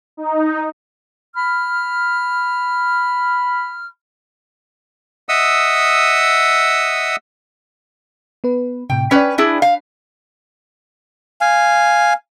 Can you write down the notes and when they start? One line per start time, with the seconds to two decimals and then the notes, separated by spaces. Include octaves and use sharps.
0.17 D#4
1.35 B5 F6
5.29 D#5 E5 F#5 D#6 E6
8.44 B3 B4
8.90 A2 C3 G5
9.11 C#4 B4 D5 G5 B5
9.38 D4 E4 G#4
9.62 F5
11.41 F5 G#5